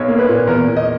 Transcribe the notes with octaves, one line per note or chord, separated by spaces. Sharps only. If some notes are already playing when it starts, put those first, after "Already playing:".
Already playing: B1 C#5
A#3
B4
A#2
E2 A#4
E2
D#5